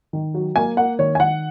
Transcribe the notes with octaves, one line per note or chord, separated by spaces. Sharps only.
D#3
F#3
A#3 G#5
A#3 F#5
D#3 C#5
G#5
D#3 F#5